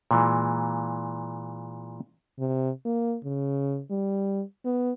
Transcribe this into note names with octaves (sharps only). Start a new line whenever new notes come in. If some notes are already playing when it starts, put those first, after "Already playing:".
A#2 E3 G#3
C3
A#3
C#3
G3
B3